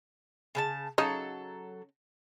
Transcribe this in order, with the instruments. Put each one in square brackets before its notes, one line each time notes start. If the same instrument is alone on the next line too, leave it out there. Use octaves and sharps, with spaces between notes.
[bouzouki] C#3 B4 A5
[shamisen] C#3 D#4 [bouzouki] F#3 A4